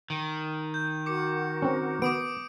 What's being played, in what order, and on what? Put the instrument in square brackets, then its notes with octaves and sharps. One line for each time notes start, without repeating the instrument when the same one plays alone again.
[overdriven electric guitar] D#3
[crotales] G6
[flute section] F#4 A#4 [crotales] D6 C#7
[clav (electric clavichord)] C4 C#4
[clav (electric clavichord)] B3 [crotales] D6 D#6 D7